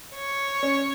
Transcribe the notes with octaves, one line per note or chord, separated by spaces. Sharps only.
C#5
C#4